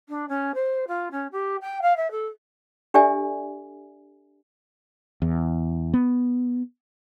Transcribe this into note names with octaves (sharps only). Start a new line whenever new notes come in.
D4
C#4
C5
F4
C#4
G4
G5
F5
E5
A4
D4 G4 A4 D5 E5 G#5
E2
B3